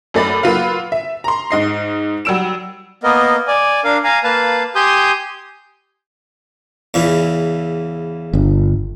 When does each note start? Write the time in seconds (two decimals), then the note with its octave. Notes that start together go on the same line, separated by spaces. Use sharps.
0.14 F#2 A3 D5 B5 A6
0.43 F#3 A#3 F4 B4 F5
0.92 E5
1.24 A#5 C6
1.51 G#2 D#5 C7
2.25 F#3 G3 E6 D7 E7
3.03 A#3 B3 A#4 D#5
3.47 D5 G#5
3.84 D4 A#4 F5
4.04 F5 G#5 A#5
4.24 A#3 B4 F5 A5
4.75 G4 G#5 C6 D#6 G6
6.94 E2 C#3 E3
8.33 G1